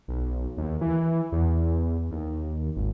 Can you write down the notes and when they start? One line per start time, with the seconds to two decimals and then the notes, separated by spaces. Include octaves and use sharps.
0.08 B1
0.57 D#2
0.81 E3
1.32 E2
2.11 D#2
2.76 G#1